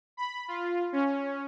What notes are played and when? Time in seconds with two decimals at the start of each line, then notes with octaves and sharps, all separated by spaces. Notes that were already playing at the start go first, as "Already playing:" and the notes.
0.17 B5
0.48 F4
0.92 C#4